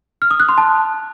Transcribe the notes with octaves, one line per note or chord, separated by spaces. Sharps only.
F6
D#6
F#6
C6
A5